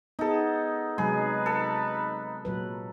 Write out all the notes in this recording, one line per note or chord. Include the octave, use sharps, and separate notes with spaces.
B3 D#4 G#4 A4
C3 F#3 G#3 D#4 G#4 B4
A4
A#2 F#3 B4